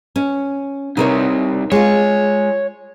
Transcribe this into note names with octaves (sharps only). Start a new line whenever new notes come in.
C#4
C2 C3 D#4 A#4 C#5
G#3 F4 C#5